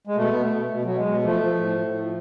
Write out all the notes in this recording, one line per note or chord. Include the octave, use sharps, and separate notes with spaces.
G#3
B2 A3
B2 B3
A3
B2
B2
B2 F#3
G#3
B2
F3 A3
F3
A2
A2
F3